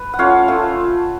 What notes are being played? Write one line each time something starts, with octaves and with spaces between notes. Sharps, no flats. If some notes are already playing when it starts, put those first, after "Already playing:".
Already playing: B4
F#5
A3 C#4 F4 C#5 F5
A3 C#4 F4